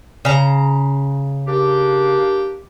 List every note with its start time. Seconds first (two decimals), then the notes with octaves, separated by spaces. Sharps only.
0.25 C#3 A#5
1.47 A#3 D4 G4